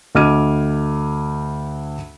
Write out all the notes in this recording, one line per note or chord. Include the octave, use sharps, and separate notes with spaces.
D2 D#5 D6 F6 G#6 D#7